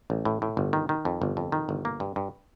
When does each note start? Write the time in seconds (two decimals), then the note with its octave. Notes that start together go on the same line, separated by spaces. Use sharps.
0.10 A1
0.25 A2
0.42 A2
0.57 G1
0.73 D#3
0.89 D#3
1.05 F2
1.22 G1
1.37 F2
1.52 D#3
1.69 G1
1.85 A#3
2.00 G2
2.16 G2